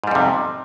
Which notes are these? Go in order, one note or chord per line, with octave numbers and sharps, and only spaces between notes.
F2 G#2 C3 G3